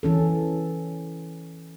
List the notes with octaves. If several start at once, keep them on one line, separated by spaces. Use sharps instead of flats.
E3 C#4 A4